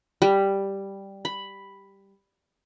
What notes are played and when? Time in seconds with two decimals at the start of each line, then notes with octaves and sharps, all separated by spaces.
0.22 G3
1.25 B5